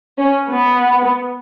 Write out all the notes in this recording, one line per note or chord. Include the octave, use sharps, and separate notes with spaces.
C#4
B3